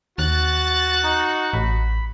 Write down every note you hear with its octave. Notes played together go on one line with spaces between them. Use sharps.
D#2 F#4 F#6 A6
D#4
A1 B5